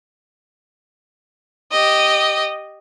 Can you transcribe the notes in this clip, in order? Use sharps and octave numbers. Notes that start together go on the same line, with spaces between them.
G4 D#5